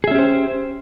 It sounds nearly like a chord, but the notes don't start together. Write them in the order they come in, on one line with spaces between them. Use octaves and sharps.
G#4 E5 C#4 G4 C5